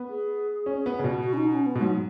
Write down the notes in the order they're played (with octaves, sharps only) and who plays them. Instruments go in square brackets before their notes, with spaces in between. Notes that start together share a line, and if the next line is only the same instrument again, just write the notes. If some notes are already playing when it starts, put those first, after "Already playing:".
Already playing: [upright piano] B3
[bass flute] G#4
[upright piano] C#4
B3
C#3
B2
[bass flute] F#4
C#4
D#4
C#4
B3
[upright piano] B2
[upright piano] G#2 [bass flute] F#3